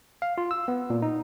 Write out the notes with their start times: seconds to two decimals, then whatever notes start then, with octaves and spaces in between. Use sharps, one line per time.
0.22 F5
0.38 F4
0.51 E6
0.68 B3
0.90 A#2
1.02 D#4